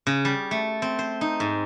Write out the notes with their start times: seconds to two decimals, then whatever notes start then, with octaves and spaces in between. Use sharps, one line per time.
0.07 C#3
0.25 G3
0.51 A3
0.82 C4
0.99 C5
1.21 D#4
1.40 G#2